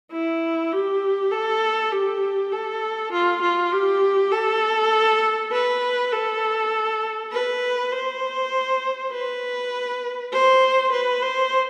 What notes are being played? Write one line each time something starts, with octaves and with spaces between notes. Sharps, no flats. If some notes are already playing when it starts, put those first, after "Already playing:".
E4
G4
A4
G4
A4
F4
F4
G4
A4
B4
A4
B4
C5
B4
C5
B4
C5